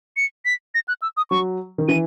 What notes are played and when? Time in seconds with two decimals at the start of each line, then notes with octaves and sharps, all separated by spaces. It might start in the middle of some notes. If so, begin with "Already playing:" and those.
0.17 C#7
0.45 B6
0.75 A#6
0.88 F#6
1.02 E6
1.17 D#6
1.30 F#3 C#6
1.78 D#3
1.88 E3 D#7